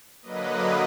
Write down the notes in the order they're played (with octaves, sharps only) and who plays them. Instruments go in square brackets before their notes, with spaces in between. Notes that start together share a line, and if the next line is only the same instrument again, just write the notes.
[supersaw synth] D3 F#3 A#3 B4 D#5